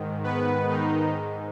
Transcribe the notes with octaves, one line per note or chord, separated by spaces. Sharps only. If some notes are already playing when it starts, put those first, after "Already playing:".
Already playing: G#2 D#3
B3 B4
D#3 D#4